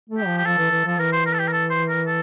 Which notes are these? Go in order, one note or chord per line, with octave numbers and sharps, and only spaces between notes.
A3
G4
F3
G4
F3 A4
E3
E3
F3 A4
E3 A#4
C5
A#4
A4
G4
A#4
A4
C5
A#4
A4